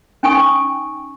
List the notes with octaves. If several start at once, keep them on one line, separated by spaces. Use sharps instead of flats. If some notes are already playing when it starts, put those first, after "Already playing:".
C#4 D#4 G5 G#5 C#6 D#6